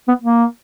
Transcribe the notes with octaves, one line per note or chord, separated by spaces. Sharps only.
B3
A#3